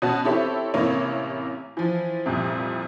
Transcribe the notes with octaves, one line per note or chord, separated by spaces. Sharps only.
B2 C#4 F#4 A5
C4 E4 G4 A4 C#5 E5
A1 C3 A#3 E4 C#5
E3 F3
C2 F2 A#2